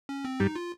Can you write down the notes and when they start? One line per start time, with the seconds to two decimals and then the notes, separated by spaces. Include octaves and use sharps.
0.09 C#4
0.25 C4
0.40 G2 G3 D#4
0.56 F4